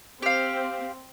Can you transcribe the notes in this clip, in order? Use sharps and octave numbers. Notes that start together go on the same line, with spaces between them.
C4 G4 F5